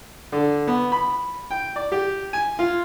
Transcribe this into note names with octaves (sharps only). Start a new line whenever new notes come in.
D3
B3
B5
G5
D5
G4
G#5
F4